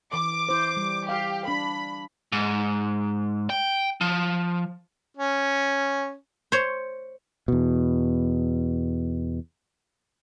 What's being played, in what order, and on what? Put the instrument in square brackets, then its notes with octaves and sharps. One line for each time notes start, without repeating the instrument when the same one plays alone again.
[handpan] E3 [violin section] D6
[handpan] E4 C5
G3
[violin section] G4 [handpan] F5
[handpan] D4 [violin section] B5
[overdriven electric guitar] G#2
G5
F3
[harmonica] C#4
[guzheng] C5 C#5
[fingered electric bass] E2 B2